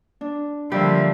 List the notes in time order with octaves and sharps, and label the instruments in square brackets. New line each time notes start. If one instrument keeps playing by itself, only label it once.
[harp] D4
[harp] D3 C6 [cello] F3 [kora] G3 [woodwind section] A#3 E5